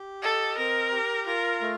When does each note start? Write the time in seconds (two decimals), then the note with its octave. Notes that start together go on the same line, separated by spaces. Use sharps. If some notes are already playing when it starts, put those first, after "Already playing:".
Already playing: G4
0.22 A4 D#5
0.58 C4 A#4
0.92 G4
1.27 F4 A#4
1.62 A3